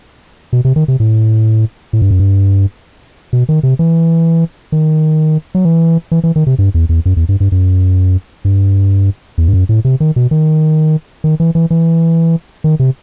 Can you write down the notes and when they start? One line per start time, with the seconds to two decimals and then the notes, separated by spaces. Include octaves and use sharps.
0.53 B2
0.65 C3
0.76 D#3
0.88 C3
1.00 A2
1.93 A2
2.02 G2
2.11 F#2
2.19 G2
3.33 B2
3.49 D#3
3.63 C3
3.79 E3
4.72 D#3
5.55 F#3
5.65 E3
6.12 E3
6.24 E3
6.36 D#3
6.47 C3
6.59 G2
6.74 E2
6.89 E2
7.06 F#2
7.17 E2
7.29 G2
7.40 G2
7.52 F#2
8.45 G2
9.38 E2
9.48 G2
9.53 F#2
9.69 A2
9.85 C3
10.00 D#3
10.16 B2
10.31 D#3
11.24 D#3
11.40 E3
11.55 E3
11.71 E3
12.64 D#3
12.80 C3